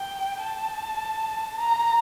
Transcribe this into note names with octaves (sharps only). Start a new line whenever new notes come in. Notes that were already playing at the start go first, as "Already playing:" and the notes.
Already playing: G5
A5
A#5